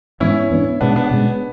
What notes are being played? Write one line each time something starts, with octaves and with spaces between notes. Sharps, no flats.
G#2 E3 B3 C#4 D4 E4
G#2 E3 B3 D4
B2 G#3 B3 C#4 D4
B3 D4
B2 G#3 C#4